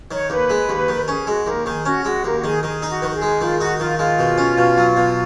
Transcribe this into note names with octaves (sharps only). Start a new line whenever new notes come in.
D#3 C#5
D#2 B4
G#3
D#2
D#3
C#4 G#4
G#3 F#4
D#2 A#4
D#3 G#4
C#4 F#4
G#3 F#4
D#2 A#4
F#4
D#3 G#4
D#3 G#4
D#4
F#4
D#3 B4
A#4
G#4
G#3
D#3 F4
D#4 F#4
D#3 F4
G#3 F4
B2
C#4
B2
F#3
B2